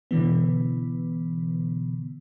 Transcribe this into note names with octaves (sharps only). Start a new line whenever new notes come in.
B2 D3 E3 B3